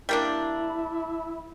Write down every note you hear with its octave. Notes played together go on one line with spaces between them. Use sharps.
G3 A#3 D4 E4